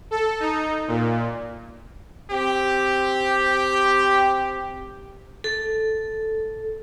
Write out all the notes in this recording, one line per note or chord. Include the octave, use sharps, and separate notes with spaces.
A4
D#4
A#2
C4 G4
A4